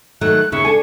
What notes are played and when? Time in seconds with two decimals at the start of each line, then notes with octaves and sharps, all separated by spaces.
0.21 D#3 F#3 A3 F#6
0.52 D#2 C#3 E5 C#6
0.65 D4 A4 G#5